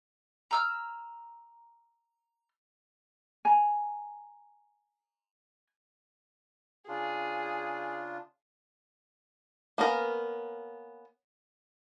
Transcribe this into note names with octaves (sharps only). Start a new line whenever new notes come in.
A#5 E6 F6
G#5 A#5
C#3 D4 F4 G#4
A#3 B3 C#4 A#4